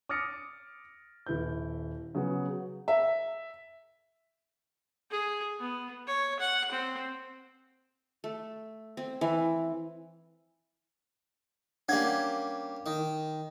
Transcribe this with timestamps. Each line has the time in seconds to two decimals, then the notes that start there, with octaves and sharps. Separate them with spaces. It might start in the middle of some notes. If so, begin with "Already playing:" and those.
0.09 D6 D#6 F6 A6 A#6 C#7
1.27 D#1 E4 B4 G6
2.15 C#3 F#3 B3 F#4
2.88 E5
5.10 G#4
5.60 B3
6.07 C#5
6.40 F#5
6.71 C4
8.24 A3
8.97 C4
9.21 E3
11.89 G3 A#3 C#4 D4 F#5 G#6
12.86 D#3